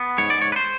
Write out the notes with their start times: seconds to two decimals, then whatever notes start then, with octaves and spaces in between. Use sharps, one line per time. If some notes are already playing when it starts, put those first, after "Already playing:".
Already playing: B3
0.18 G#2 C#5
0.30 D5
0.42 C#5
0.52 B4
0.56 C5